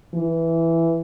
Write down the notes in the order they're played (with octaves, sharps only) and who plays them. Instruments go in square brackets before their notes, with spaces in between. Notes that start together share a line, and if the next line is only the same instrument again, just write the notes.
[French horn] E3